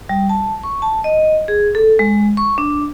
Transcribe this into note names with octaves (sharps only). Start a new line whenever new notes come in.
G3
A5
C#6
A5
D#5
G#4
A4
G#3
C#6
D4